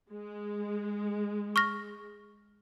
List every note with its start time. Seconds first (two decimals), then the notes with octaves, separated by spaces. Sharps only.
0.12 G#3
1.56 C#6 F6 A#6